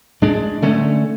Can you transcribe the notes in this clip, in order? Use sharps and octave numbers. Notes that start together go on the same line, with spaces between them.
A2 G#3 D4
D3 A3 C#4